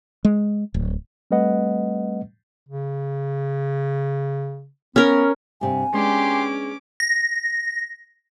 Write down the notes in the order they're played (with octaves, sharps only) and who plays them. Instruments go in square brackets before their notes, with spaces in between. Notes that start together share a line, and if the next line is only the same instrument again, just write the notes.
[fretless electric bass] G#3
D1
[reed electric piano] G3 A3 C4 B4 D#5 F#5
[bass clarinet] C#3
[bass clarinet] B3 [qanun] C#4 A#4
[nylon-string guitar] G2 C3 [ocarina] G#5
[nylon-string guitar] G#3 B3 D4 [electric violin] C#4 D6 [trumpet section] G4 C6
[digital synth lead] A#6